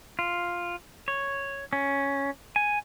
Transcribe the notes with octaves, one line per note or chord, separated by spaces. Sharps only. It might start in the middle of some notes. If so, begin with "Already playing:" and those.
F4
C#5
C#4
G#5